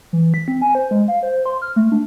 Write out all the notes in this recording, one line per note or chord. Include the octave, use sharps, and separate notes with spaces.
E3
B6
C4
G#5
C5
G#3
F5
C5
C6
F6
A3
D4